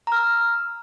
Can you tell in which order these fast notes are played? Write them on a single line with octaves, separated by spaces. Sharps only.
A#5 F6 E6